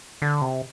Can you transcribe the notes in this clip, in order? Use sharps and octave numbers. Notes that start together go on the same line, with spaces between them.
D3
C3